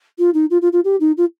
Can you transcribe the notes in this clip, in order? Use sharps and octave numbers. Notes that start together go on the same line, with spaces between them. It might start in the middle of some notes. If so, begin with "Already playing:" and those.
F4
D#4
F4
F4
F4
G4
D#4
F4